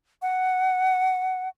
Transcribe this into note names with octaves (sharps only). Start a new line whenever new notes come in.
F#5